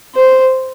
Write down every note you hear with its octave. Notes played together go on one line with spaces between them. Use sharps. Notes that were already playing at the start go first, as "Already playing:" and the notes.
C5